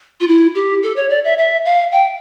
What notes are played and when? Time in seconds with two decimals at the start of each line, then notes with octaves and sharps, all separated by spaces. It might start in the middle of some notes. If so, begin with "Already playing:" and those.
0.20 F4
0.27 E4
0.55 G4
0.83 A4
0.96 C#5
1.09 D5
1.24 E5
1.38 E5
1.65 F5
1.92 G5